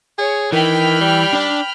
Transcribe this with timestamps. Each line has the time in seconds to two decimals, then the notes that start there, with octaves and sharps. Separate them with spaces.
0.18 G#4 C#5
0.52 D#3 E3 G5 B5 F6
1.01 G3
1.33 D4 D5